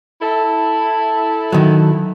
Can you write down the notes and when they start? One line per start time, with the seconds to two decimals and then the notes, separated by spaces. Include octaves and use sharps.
0.22 E4 A4
1.52 D#3 F#3